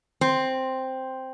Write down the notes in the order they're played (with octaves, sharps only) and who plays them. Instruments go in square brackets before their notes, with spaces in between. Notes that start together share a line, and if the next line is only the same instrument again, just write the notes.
[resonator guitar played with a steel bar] C4